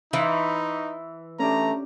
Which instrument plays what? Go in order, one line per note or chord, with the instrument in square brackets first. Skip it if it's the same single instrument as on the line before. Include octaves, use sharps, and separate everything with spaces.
[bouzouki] E3 [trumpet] D#4 [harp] C5 C6
[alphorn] A3 [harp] C#4 D4 G4 [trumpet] A#5